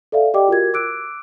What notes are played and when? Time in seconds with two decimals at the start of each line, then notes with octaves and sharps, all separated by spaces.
0.12 A4 D5 E5 F5
0.34 G4 D5 D#5 G5 D6
0.48 F4 F#4 A#4 G#6
0.74 D6 E6 F#6 D7